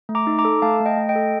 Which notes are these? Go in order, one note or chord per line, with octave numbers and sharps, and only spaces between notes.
A3
A#5 D6
D#4
A#5 D6
A4
A3 F5 A5
A3
D#5 G5
A3
D#5 G5
A4